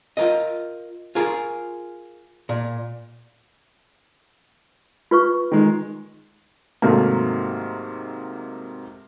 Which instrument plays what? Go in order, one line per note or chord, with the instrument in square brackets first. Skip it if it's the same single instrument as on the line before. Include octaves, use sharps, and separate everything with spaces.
[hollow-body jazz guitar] F4 A#4 D#5
F4 G#4 A#4
A#2
[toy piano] F4 B4 C#6
[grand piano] D#3 G#3
[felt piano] G#2 C3 D#3 F#3 A3 A#3